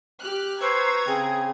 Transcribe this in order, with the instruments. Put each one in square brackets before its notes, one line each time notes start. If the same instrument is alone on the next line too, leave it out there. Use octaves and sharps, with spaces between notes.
[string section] G4 F6 F#6
[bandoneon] B4 C#6 E6 [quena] C5 [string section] A#5 G#6
[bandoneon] C#3 C4 [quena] G#4